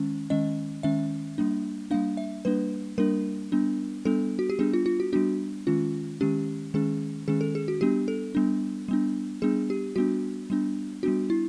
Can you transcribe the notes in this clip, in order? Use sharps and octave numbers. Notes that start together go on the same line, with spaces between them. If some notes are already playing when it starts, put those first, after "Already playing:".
Already playing: D#3 G#3 C#4
D#3 G#3 C#4 D#5
D#3 G#3 C#4 E5
G3 A#3 D4
G3 A#3 D4 F5
E5
G3 A#3 D4 B4
G3 A#3 D4 A#4
G3 B3 D4
G3 B3 D4 A4
F#4
G4
G3 B3 D4 G#4
F4
F4
F#4
G3 B3 D4 F#4
D#3 G#3 C#4 F4
D#3 G#3 C#4 G4
D#3 G#3 C#4 G#4
D#3 G#3 C#4 G#4
A4
G#4
F#4
G3 B3 D4 G4
A4
G3 B3 D4
G3 B3 D4
G3 B3 D4 G#4
G4
G3 B3 D4 F#4
G3 B3 D4
G3 B3 D4 F#4
E4